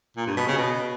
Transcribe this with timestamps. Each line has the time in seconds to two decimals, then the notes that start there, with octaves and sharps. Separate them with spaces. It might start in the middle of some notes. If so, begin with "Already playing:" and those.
0.17 A#2
0.27 G2
0.37 B2
0.47 C#3
0.58 B2